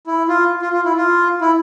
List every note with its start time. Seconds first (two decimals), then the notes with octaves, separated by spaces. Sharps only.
0.07 E4
0.28 F4
0.62 F4
0.73 F4
0.85 E4
0.96 F4
1.41 E4